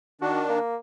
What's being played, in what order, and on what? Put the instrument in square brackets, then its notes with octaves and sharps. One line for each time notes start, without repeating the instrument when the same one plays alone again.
[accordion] D#3 D4 [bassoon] F#4
[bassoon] A#3